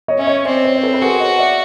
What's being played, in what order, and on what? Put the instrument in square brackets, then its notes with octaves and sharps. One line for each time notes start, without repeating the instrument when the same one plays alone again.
[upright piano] C#5 D#5
[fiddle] C#4 [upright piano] E5
[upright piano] C#5 D#5
[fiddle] C4 [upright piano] C5 D5
[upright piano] B4 C#5
C5
A4 B4
B4
[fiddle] F#4 [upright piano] G#4 A#4
[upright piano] C#5 D#5
D5 E5